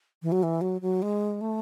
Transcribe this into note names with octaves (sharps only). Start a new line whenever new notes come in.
E3
F#3
E3
F#3
F#3
G#3
A3